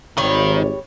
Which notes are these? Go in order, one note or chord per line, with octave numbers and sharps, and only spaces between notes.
G#1 D#3 G3 C#5